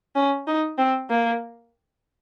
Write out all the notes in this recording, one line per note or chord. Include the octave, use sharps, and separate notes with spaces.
C#4
D#4
C4
A#3